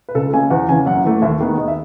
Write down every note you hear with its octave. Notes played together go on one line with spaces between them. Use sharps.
B4
C#2 A4
C#3 G#3 G#5
E2 F#5
C#3 E3 G#5
F#2 F#5
E3 A3
D#2 E5
D#3 G#3 B3
D#2 D#5
E5